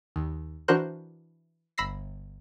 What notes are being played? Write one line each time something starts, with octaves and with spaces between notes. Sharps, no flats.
D#2
E3 D4 F#4 A#4 C5 F#6
G1 B5 E6 A#6 C7